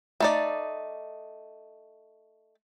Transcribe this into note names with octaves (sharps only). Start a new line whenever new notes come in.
A3 D#4 D5